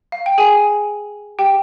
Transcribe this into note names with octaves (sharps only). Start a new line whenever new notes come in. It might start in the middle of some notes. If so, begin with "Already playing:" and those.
F5
G5
G#4 G#5
G4 G5